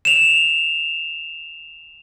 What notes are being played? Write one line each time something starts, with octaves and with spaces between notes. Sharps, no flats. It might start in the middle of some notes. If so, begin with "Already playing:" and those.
E7 F7